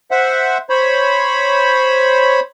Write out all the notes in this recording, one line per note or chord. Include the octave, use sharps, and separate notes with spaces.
C5 E5 F#5
C5 C#5 B5